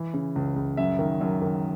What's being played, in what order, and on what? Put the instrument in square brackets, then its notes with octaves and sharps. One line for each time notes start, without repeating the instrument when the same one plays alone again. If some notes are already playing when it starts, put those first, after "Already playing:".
Already playing: [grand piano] E3
C#3
C#2
C#2
F#2 E5
D#3
F#2
D#3